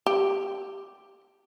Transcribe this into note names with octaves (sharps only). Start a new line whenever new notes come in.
G4